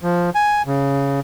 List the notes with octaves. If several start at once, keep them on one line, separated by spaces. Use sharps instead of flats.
F3
G#5
C#3